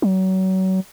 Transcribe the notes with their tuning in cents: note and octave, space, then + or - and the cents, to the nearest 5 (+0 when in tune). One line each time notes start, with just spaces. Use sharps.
F#3 +30